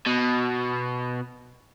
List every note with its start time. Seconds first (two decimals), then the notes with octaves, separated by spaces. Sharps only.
0.06 B2